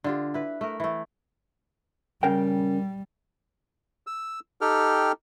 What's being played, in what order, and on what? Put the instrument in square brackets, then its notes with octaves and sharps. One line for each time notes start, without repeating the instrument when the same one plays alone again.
[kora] D3 F4 G4
E4 B4
A3 A#4
E3 A3
[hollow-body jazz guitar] C#3 A#4 G5 [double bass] G3
[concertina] E6
D#4 G4 A4 G5 F6